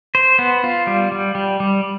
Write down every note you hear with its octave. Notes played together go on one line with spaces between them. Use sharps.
C5
B3
F4
G3
G3
G3
G3